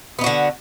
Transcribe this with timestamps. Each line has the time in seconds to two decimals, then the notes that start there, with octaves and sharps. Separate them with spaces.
0.19 B3
0.21 D#4
0.24 F#4
0.26 D3